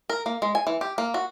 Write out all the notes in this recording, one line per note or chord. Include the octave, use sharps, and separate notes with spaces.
A#4
A#3
G#3
G#5
E3
G4
A#3
F#4